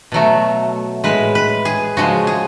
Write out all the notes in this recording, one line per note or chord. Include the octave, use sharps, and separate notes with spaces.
B2 F#3 A3
A2 G#3 B4
B4
G#4
C#3 F3 G#3 F#4
G#4